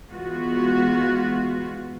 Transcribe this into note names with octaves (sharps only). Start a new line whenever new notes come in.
E3 G#3 B3 F4 F#4